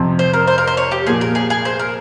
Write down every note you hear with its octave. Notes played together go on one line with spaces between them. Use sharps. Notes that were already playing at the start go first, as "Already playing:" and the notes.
Already playing: F2 C3 F3
C5
A#4
C5
A#4
C5
C#5
G4
A#2 F3 A#3 G#4
A#4
G#4
G#4
C5
A#4